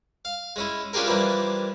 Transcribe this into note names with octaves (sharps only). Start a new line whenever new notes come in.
F5
G#3 C#4 E4
C#4 D4 F4 G4 G#4 A#4
E3 F3 G3 A#3 D4